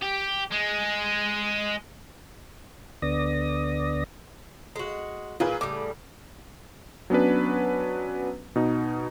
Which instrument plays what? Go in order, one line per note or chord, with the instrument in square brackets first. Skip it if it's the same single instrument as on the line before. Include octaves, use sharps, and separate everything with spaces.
[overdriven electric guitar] G4
G#3
[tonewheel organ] D2 D3 B3 D5 D#6 A#6
[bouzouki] G#3 F#4
[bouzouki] A#2 [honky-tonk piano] F4 G#4 B4
[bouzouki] A2 C#3 G3 [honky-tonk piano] D6
[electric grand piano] F#3 B3 C#4 D4 B4
B2 D#4